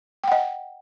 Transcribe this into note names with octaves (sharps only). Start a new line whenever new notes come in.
D#5 F#5 G5